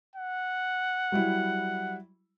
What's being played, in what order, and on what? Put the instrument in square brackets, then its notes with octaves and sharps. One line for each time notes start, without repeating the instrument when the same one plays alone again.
[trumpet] F#5
[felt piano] F#3 G3 E4